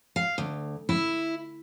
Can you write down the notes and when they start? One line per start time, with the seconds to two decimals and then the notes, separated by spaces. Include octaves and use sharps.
0.16 F5
0.38 D2
0.89 E4